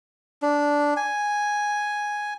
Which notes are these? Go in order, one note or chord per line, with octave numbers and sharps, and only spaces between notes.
D4
G#5